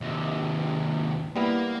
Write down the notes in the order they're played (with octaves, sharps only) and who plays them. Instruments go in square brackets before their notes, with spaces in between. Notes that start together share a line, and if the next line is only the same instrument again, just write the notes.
[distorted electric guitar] D#2 C3
[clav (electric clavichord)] G3 B3 E4 [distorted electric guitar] A#3